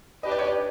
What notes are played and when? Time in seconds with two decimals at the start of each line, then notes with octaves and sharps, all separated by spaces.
0.23 D4 G4 B4 D#5
0.31 D5
0.39 C#5
0.47 D5